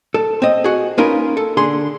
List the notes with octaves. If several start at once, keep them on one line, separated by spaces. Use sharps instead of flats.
A4
C4 D#5
F#4 G#4
A#3 C#4 D#4 F4 A#4 B4
A4
D3 G#4 C6